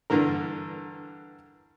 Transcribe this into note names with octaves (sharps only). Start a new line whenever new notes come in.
G2 D3 E3 A#4